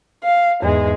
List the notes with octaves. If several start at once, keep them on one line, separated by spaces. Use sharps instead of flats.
F5
E2 G#2 G#3